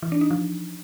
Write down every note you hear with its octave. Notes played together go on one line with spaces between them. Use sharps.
E3
D4
D#4
F3